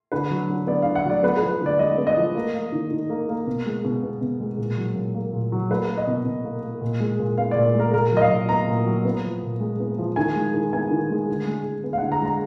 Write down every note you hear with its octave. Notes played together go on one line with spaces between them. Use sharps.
D3 B4
F#3
D3
B3 D5
D3 F5
F#5
F#3 D5
B3 B4
F3 B4
D3
D5
G#3 D#5
B3
D#5
F3
A#3
A#3
D#3
D#3
A#3
A#3
B2
G#3
B2
B3
B2
G#3
A#2
F#3
A#2
A#3
A#2
F#3
A#3 B4
A#3
D#5
B2
B2
A#3
A#3
A#2
G#3
A#2
B3 F5
A#2 D5
G#3 A#4
A#2 A#4
F#3
D#5
F5
A#2
B3 A#5
A#2
F#3
B3
F3
A#2
G#3
B3
F3
D#3 G#5
G#3
D#3
B3 G#5
D#3
G#3
D3
G#3
D3
B3
F5
D3 F#5
A#5
G#3 A#5